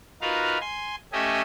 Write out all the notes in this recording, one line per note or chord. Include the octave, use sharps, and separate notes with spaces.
D#4 F4 F#4 A#4 B4 F5
G#5 C6
A3 C#4 G4 D#5 E5 G#5